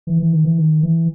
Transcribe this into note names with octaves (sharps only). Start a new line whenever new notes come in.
E3
E3
D#3
E3
D#3
E3